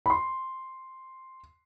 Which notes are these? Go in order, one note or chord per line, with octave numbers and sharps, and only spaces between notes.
B5
C6